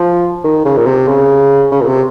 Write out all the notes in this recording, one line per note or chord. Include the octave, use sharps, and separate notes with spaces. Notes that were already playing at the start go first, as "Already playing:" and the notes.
Already playing: F3
D#3
C#3
A#2
C3
C#3
C#3
A#2
C3